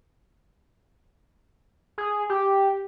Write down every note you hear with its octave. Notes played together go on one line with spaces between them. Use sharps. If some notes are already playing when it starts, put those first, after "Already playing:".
G#4
G4